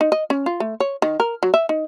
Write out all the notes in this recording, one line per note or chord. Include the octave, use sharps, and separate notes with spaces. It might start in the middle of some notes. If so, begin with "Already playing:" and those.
D#4
D#5
C#4
F4
A3
C#5
D#3
A#4
F#3
E5
D#4